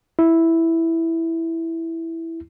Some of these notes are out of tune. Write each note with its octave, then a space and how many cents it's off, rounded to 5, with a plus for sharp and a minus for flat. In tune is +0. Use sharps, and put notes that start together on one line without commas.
E4 -5